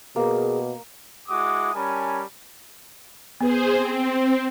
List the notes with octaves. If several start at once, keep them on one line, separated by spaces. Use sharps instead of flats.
B2 A#3 G#4
G#3 E4 F#4 D6 D#6
G3 C#4 A#4 G#5 A5 B5
B3 G#4 B4 C5
C4